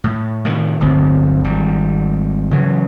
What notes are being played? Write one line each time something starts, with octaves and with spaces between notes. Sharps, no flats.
A2
A2 C3 D#3
D1 G1 D2 C4
G#1 G3
C#3 E3 F#3